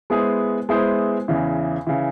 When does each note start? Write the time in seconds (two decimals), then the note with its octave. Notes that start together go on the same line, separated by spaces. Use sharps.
0.10 G#3 B3 E4 G#4 C5
0.69 G#3 B3 E4 G#4 C5
1.28 E2 C#3 E3
1.87 C#3 E3